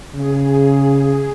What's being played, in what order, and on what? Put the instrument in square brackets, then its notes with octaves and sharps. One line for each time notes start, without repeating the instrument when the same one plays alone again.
[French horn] C#3 [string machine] G#4